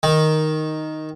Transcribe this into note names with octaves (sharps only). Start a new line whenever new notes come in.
D#3